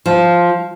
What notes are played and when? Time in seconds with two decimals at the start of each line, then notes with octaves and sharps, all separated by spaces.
0.06 F3